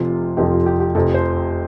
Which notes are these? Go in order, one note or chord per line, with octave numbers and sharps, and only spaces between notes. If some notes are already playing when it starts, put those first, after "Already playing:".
Already playing: F1 F2 C3 F3 F4
F1 F2 C3 F3 G4
F4
G4
G4
F1 F2 C3 F3 A4
C5